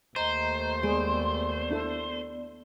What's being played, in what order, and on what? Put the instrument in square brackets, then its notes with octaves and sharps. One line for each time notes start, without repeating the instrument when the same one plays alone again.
[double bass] D#2 A3 [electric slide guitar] C5 [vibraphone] D#5 A#5
[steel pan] G#3 G#4 [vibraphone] B3 D5
[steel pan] D4 E4 A4